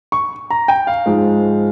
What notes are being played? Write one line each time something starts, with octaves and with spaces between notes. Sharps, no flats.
C#6
A#5
G5
F5
G#2 F3 G#3